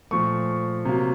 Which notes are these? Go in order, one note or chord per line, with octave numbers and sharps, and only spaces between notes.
A#2 F3 A3 C#6
C3 F#3 A#3